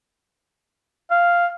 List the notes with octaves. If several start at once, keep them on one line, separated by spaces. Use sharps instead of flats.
F5